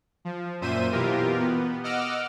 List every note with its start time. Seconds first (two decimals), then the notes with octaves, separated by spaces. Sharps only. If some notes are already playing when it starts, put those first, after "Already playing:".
0.25 F3
0.61 F#2 A#2 C5 E5 D#7
0.92 B2 E3 F4 G4 A#4
1.39 B3
1.83 D#5 F#5 D6 E6 F6